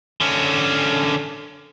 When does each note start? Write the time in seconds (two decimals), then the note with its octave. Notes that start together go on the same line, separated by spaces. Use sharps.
0.21 D3 C#4